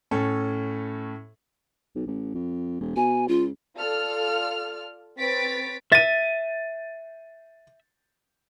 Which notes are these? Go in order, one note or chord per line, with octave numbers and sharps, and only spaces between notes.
A2 C#4 A4
B1
A1
F2
E1
B2 G#5
C#2 F4
F4 A4 D5 F6
C4 B4 C#5 A6 B6 D7
E5 A6 D#7